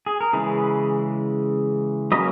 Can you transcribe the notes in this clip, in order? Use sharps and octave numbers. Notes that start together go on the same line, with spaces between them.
G#4
A#4
C#3 E3 G#3 G#4 B4
F#3 A#3 C#4 B4 D#5